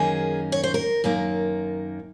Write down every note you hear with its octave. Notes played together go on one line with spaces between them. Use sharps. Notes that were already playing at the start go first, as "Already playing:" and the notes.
Already playing: F#2 D#3 A#3 C#4 G#4
C#5
C5
A#4
F#2 D#3 A#3